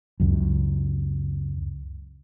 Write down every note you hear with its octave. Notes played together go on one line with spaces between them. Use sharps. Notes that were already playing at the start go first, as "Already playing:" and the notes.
C#2 F#2